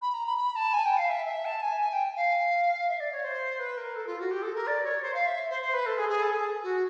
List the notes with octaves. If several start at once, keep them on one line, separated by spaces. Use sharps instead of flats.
B5
A#5
B5
B5
A5
G#5
G5
F5
E5
E5
A5
G#5
G#5
G5
F5
E5
D5
C#5
C5
B4
A#4
A4
F4
F#4
G4
A4
A#4
D5
C#5
C5
F5
E5
C5
C5
B4
A4
G#4
G#4
A4
G#4
F#4